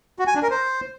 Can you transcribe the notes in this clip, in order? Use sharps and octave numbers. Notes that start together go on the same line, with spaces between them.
F#4
G#5
D4
A#4
C5